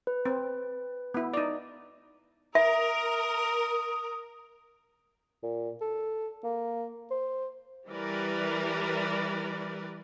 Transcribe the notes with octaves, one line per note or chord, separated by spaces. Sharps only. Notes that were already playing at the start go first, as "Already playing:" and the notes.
B4
C4
B3 E4
D#4 D5
A#4 E5 D#6
A#2
A4
A#3
C5
E3 G3 A#4 B4 D5